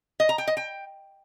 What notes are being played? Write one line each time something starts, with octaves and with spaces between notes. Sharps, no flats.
D#5
A#5
G5
D#5
G5